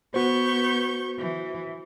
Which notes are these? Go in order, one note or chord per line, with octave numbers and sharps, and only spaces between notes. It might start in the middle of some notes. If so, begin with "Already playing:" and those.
B3 F#4 C5 C#6 G6
E3